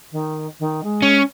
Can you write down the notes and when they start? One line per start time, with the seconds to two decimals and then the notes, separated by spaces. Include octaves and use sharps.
0.11 D#3
0.59 D#3
0.83 G#3
1.02 C#4